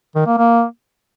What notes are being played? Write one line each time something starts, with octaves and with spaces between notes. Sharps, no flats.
D#3
A#3
A#3